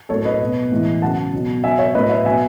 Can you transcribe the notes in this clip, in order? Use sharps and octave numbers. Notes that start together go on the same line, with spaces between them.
A2 F#3 A4 C#5
B4 D#5
B2 F#3
A2 E3 G#3
C#3 F#3 F#5 A5
B2 F#3
B2 F#3 E5 G#5
C#5 E5
A2 F#3 B4 D#5
C#5 E5
B2 F#3 E5 G#5